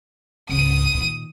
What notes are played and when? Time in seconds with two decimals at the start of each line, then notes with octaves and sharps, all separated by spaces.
0.49 C#2 G#2 D#6 D#7
0.94 A#2 D#3